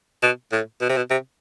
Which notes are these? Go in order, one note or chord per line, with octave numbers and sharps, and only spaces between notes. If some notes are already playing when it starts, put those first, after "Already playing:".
B2
A2
B2
C3
B2
C3